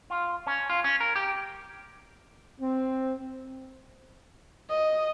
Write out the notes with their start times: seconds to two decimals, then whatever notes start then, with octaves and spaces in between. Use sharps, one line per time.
0.10 F4
0.47 C#4
0.70 F4
0.84 C#4
1.00 A#4
1.16 G4
2.60 C4
4.69 D#5